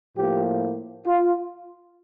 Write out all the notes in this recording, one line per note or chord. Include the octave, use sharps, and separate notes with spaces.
A2 F3 A#3 G4
F4